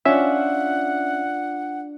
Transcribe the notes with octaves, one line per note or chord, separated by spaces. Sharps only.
C#4 D4 F4 E5 F#5